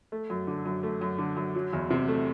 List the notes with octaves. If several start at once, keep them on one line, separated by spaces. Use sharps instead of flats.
A3
F#2
D3
F#2
A3
F#2
D3
F#2
F#3
E2
C3
A3